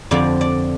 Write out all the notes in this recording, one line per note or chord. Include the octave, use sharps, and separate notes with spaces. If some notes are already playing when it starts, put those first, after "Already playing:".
F2 D3 F3 D5
D5